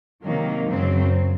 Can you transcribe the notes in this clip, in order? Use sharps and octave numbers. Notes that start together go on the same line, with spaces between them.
C3 D#3 F#3 A#3
F#2 C#3 F#3 C4